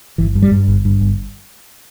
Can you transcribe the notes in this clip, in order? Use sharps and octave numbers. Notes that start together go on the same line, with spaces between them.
G1 E3
G2
G3
G2
G1
G2
G1